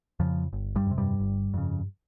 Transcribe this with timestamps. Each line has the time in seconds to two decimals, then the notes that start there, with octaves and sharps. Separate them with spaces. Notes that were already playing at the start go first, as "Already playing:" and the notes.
0.20 F2 C#3 F3
0.53 G1
0.76 G2 G3
0.86 F2 C3
0.98 G2 G3
1.20 G1
1.54 F2 C#3